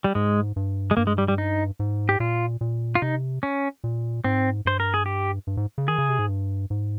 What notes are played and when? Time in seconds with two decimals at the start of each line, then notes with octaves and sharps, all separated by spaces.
0.04 G3
0.15 G#2 G#3
0.56 G2
0.91 G#3
0.97 G2 A#3
1.07 G#3
1.18 G3
1.28 G3
1.38 D#4
1.79 G#2
2.09 G4
2.20 A#2 F4
2.61 A#2
2.95 F4
3.02 C3 D#4
3.43 C#4
3.84 A#2
4.24 G#2 C4
4.65 G2 C5
4.80 A#4
4.94 G#4
5.06 G4
5.47 G2
5.57 G#2
5.78 C#3
5.88 D#3 G#4
5.98 C#3
6.09 C3
6.19 G#2
6.29 G2
6.70 G#2